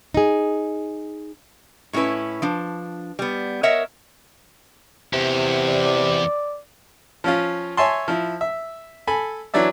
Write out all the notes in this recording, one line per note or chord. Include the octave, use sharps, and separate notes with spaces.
D#4 G#4
A2 G#3 C#4 E4 B4
F3 D4
G3 B3
A#4 C#5 D#5 E5 F#5
E2 C3
D5
F3 C#4 F4
C#5 E5 G#5 A5 C6
F3 E4
E5
A4 G#5 B5
E3 F#3 D4 D5 E5